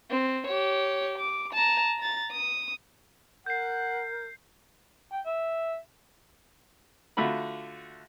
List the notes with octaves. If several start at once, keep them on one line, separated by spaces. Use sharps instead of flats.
C4
G4 C#5
D6
A5 A#5
A#5 A6
D#6
A#4 F#5 G6 C7
G5
E5
D3 A3 F4 F#4 B5